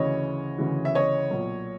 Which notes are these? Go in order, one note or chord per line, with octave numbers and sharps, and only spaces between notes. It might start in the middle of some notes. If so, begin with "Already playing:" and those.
Already playing: D2 C#3 E3 C#5 D#5
D2 C#3 E3
E5
C#5 D#5
B1 A#2